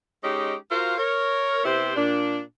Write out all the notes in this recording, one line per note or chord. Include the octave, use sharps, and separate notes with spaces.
G#3 C#4 D#4 G4
F4 F#4 A#4 C5 F5
A#4 C#5
C3 B3 E4 G4 C5
A#2 D4